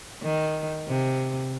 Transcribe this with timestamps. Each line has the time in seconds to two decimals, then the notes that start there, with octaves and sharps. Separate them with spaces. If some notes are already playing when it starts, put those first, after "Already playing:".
0.23 D#3
0.88 C3